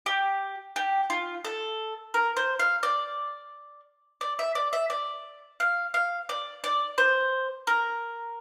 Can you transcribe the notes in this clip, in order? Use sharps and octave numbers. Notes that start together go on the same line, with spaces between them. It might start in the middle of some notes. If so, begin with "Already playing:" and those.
G4
G4
F4
A4
A#4
C5
F5
D5
D5
E5
D5
E5
D5
F5
F5
D5
D5
C5
A#4